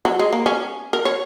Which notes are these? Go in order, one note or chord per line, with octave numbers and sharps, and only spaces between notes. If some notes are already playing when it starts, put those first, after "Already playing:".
F#3
G#3
A#3
C#4
A#4
C#5